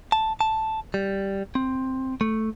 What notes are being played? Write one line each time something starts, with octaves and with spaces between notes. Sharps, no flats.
A5
A5
G3
C4
A3